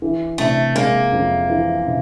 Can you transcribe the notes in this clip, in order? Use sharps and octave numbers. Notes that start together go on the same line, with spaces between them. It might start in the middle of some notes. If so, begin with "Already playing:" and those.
E3
C3 A3
G#3 A#3
F2
E3
C3